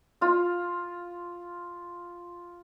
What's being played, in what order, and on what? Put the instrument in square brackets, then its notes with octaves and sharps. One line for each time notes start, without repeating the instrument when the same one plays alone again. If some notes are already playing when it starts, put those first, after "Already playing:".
[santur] F4 F5